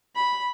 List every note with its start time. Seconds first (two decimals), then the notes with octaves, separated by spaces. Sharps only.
0.16 B5